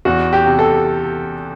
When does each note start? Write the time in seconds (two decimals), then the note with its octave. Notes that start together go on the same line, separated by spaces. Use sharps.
0.05 E2 F#4
0.33 G4
0.46 C3
0.59 A4